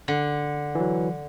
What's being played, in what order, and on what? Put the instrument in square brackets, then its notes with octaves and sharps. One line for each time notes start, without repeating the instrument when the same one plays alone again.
[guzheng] D3
[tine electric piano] E3 F#3